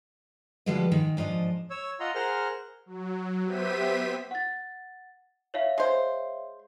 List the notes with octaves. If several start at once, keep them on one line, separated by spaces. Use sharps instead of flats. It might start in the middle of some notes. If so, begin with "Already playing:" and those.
D3 F3 G3 G#3 F#4 B4
G#2 D#3
G#2 F3 D4 D#5
C#5 E6
F4 D#5 F#5 A#5 C6
G#4 A#4 C5 F#5 F6
F#3
B3 G4 C5 E5 B6 D#7
F#5 A6
C#5 E5 F5
G#3 C5